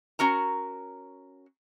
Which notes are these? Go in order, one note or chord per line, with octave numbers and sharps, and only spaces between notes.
C#4 F#4 A#4 A#5